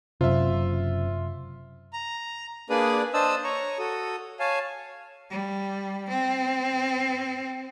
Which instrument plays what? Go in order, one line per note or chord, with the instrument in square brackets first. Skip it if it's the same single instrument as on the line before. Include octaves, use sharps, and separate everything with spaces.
[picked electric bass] F#1 F#2 [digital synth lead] C3 [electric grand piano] F4 E5
[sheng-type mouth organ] A#5
A#3 D4 G#4 B4 D5 D#6
D4 C5 D#5 A5 D#6 E6
C#5 A#5 C#6
F#4 A4 D#6
C#5 F5 G#5 A5
[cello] G3
C4